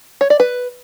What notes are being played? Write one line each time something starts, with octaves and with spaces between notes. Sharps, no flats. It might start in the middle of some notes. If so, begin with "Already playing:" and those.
C#5
D5
B4